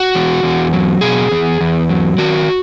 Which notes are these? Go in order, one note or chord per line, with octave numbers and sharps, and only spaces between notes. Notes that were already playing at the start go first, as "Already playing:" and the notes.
Already playing: F#4
E2
E2
F#3
B2 G#4
E2
E2
F#3
D#3 F#4